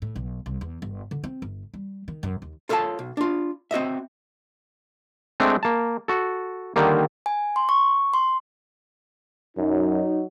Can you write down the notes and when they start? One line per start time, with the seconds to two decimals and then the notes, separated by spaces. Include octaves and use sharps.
0.02 A2
0.16 B1
0.46 C2
0.61 E2
0.82 G1
1.11 D3
1.24 C4
1.42 G1
1.74 G3
2.08 D#3
2.23 F#2
2.42 D#2
2.69 F4 A4 C#5 E5 F5 A5
2.99 B1
3.17 D4 F4
3.71 C4 F#4 D#5 E5
5.40 G#3 A3 C4 D4
5.63 A#3 A5
6.08 F#4 A4
6.76 D3 D#3 G3 A#3
7.26 G#5
7.56 C6
7.69 C#6
8.14 C6
9.58 F#2 F#3 D#4